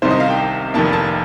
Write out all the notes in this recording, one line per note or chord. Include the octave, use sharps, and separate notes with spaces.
C2 C3 D#3 C5
D#5
F5
G5
F1 F2 C3 D#3 A#3 A5
A5